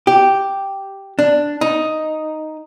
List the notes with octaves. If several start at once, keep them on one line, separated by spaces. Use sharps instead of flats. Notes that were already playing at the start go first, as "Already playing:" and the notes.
G4
D4
D#4